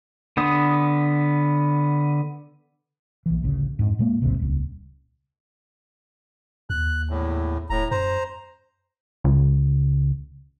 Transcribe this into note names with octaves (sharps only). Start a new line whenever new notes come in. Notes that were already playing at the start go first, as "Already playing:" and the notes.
D3 B3 D#6
A#1 E3
A1 D2 C#3
F2 G#2
A#2 G#3 A#3
A#1 D#2 G#2 C3
D#1 C#2
D#2 F#6
E2 A2
D#1 A2 A#5
F#2 C5 A#5
C#2